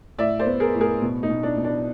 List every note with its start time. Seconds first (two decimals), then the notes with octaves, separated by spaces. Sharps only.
0.18 A2 D5 E5
0.39 C5 D5
0.46 B3
0.60 G#4 A#4
0.74 A2
0.81 G#4 A#4
1.02 B2
1.23 D#4
1.29 B2
1.43 D4
1.57 B2
1.64 D4